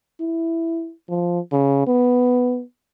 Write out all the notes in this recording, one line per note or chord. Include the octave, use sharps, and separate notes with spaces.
E4
F3
C#3
B3